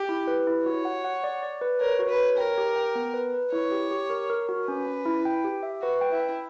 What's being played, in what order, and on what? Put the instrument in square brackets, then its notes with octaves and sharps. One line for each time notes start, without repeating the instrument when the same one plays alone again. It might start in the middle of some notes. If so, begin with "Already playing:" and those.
Already playing: [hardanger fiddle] G4
[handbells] E4
B4
E4
[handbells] F#4 [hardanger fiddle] C#5
[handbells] F#5
F#5
D5
D5
B4
[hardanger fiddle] A#4 [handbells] C#5
[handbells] F#4
[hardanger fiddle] B4
[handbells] C#5
[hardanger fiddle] A#4 [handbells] G5
[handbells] G4
G5
B3
B4
B4
[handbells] E4 [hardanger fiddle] C#5
[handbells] G4
G4
A#4
A#4
F#4
[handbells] C#4 [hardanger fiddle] B4
[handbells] C#4
E4
G5
G4
E5
[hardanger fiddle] F#4 [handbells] B4
[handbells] G5
[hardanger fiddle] E4
[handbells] E5